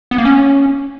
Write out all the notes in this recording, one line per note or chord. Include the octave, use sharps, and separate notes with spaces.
B3
A#3
C#4